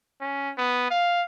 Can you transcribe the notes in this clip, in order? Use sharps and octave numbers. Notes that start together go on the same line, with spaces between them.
C#4
B3
F5